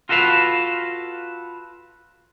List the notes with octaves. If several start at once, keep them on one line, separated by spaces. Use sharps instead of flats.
F4 F#4 A4 B4 F5